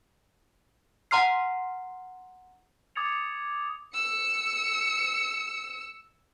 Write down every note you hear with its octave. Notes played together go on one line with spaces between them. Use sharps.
F#5 A#5 C6 F6 C7
D6 D#6 G#6 A6 C#7 F7
E6 C#7